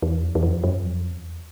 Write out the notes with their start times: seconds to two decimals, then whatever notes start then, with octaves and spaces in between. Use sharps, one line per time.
0.03 E2
0.22 F2
0.35 E2
0.43 F2
0.64 F#2
0.83 F2
1.11 E2